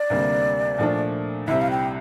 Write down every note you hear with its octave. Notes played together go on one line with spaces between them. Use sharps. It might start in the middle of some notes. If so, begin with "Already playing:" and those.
Already playing: D5
D2 C3 G3 A#3
A#2 F3 A3 D4
C2 C3 G3 E5
F5
G5